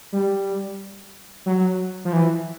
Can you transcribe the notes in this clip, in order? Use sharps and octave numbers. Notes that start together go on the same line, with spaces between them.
G3
F#3
F3
E3